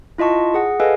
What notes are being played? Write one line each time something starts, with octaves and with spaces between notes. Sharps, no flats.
E4 F4 D#5 A5 C#6
G#4 F#5
G#4 A4 B4 D#5 F5 G#5